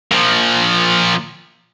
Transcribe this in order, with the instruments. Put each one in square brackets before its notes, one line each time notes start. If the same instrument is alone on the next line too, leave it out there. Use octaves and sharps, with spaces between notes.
[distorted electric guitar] A#2 F3